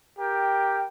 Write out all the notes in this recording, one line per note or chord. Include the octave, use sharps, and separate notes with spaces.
G4 A#4 G5